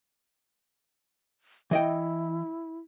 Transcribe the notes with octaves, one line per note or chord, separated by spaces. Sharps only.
E3 E4 D#5 G5